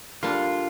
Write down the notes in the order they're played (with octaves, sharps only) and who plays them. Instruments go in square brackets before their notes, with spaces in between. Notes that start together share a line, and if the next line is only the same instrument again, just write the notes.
[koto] D3 G3 A#3 D4 [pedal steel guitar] F4